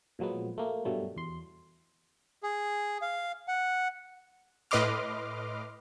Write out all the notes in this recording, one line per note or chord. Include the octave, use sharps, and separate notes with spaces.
A#2 F3 F#3 G#3 B3
A3 A#3
G2 B2 F#3 G3 A3
E2 C6
G#4
F5
F#5
A2 B4 D#5 C6 D6 F6